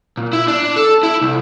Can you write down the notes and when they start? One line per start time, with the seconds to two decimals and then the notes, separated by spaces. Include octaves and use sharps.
0.17 A#2
0.33 E4
0.48 D4
0.76 A4
1.03 E4
1.21 C2